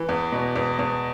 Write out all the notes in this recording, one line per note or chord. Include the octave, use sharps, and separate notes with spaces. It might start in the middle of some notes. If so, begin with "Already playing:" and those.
Already playing: E3
E2
B2
E2
E2